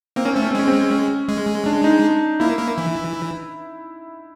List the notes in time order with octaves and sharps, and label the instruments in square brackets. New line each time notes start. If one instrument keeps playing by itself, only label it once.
[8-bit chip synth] A#3 [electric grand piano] C4
[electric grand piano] C#4
[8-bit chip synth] A3 [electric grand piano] C4
[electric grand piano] C#4
C4
[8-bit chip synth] G#3 [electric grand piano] C#4
[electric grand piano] C4
C#4
[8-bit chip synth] G#3
[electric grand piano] D4
D#4
[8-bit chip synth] A#3 [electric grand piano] E4
[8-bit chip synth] A#3
E3